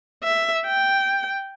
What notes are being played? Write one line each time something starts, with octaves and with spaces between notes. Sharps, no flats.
E5
G5